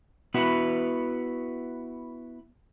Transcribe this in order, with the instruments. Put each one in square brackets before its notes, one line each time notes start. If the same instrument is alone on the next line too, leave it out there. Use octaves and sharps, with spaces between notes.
[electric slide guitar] B3 E4 F#4 B4